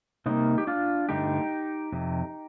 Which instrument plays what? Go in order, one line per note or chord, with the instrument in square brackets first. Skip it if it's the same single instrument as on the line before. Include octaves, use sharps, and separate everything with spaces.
[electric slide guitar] C3 G3 A#3 C4 D#4
G4
D4 F4
G2 D3 A3 D#4 G4
F2 C3